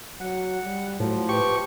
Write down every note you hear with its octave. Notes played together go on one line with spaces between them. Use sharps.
F#3 F#5
G3
A2 F3 F#3
G4 B4 C#6